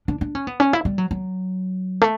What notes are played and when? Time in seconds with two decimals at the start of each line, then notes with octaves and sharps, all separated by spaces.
0.08 D4
0.21 D4
0.35 C#4
0.47 B3
0.60 C#4
0.73 E4
0.85 G3
0.98 F#3
1.11 F#3
2.01 A3